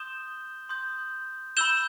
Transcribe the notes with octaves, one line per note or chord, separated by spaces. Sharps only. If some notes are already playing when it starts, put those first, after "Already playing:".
Already playing: C6 D#6 G6 E7 G7
C6 D#6 G6
B5 E6 G6 E7 G7